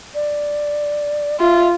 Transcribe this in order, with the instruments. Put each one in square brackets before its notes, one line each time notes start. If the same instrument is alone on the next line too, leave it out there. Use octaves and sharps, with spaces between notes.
[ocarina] D5
[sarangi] F4 [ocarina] E5